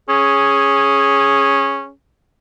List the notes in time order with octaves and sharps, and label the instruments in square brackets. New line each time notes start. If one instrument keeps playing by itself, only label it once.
[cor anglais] C#4 [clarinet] G#4